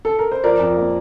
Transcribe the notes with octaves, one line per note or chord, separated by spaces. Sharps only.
A4
A#4
C5
F3 A#4 D5
F2
A#3